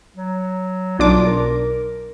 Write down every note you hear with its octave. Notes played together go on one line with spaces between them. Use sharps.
F#3
B1 D4 F4 D6
A#4